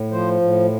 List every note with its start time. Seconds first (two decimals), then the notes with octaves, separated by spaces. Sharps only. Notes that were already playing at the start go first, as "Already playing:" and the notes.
Already playing: A2
0.11 F3 C5
0.41 A2